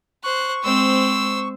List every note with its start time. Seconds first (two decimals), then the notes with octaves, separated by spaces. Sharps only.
0.24 C5 C#6 F#6
0.63 G#3 C4 C5 E6